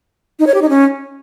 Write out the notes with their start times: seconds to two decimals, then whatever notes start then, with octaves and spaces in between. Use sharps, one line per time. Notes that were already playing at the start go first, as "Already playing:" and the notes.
0.39 D#4
0.47 C#5
0.54 G4
0.62 D#4
0.69 C#4